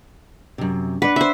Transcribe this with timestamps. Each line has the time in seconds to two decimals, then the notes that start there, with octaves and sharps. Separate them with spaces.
0.58 F#2 C3
1.02 D4 B4 F#5
1.16 C5 E5